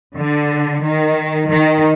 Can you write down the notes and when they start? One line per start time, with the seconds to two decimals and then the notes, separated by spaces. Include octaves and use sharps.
0.17 D3
0.82 D#3
1.48 D#3